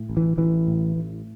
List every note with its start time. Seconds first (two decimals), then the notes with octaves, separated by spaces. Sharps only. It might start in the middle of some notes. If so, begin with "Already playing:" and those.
Already playing: A2
0.10 A1
0.17 E3
0.37 A1 E3
0.67 A2
0.96 A1